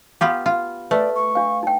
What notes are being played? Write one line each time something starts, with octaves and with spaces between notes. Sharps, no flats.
B3 F4 G4
F4
A3 B4 D5
C#6
D4 F5
D#4 G5